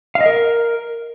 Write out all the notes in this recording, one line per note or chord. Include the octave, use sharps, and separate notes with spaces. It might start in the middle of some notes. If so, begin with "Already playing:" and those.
F5
D#5
A#4